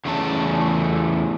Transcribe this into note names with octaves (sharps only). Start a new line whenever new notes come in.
E2 C#3 A3 C#4 E4 A5